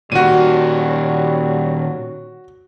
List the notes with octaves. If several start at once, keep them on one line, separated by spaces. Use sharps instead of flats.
A#2 D#3 F#3 G3 F#4 D#7